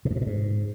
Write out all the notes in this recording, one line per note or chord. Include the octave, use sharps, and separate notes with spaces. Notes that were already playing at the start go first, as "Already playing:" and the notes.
B2
G2
B2
A#2
G#2